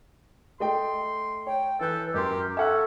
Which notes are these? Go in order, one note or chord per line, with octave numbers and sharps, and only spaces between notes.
A3 D#5 G5 C6
C#5 G5
E3 A4 B4 G6
F#2 G4 A#4 C6
C#4 A4 E5 F#5 F#6